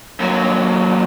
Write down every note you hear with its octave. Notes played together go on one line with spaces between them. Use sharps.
D#2 F#3